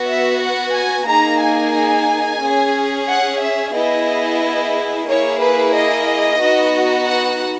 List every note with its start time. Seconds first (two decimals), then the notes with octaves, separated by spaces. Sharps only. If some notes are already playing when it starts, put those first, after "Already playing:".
Already playing: B3 F#4
0.08 E5
0.41 F#5
0.74 G#5
1.08 A#3 D#4 G#4 A#5
1.41 G#5
2.41 C#4 G#4
3.08 F#5
3.41 E5
3.74 B3 E4 G#4 D#5
5.07 A#3 E4 G#4 C#5
5.40 B4
5.73 D#5
6.40 B3 D#4 F#4
7.06 F#5